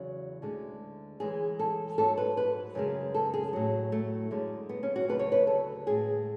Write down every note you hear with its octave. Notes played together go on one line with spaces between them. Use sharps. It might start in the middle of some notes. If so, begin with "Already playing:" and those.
Already playing: E2 C#3 F#3
D2 D3 G#3
F#2 E3 G#3 G#4
A4
G#2 F#3 A4
B4
B4
F#2 C#3 G#3
A4
G#4
A2 F#3
A3
F#2 D3 G#3
B3
C#4
F#4
D2 C#3 F#3 B4
C#5
B4
A4
A2 G#3 G#4